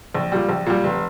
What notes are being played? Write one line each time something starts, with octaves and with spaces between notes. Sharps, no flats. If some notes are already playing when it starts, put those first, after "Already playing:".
A#1
A#2 G3
A#1
A#2 G3
F1